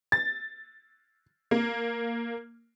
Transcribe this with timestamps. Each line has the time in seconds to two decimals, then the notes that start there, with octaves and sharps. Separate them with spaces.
0.12 A6
1.51 A#3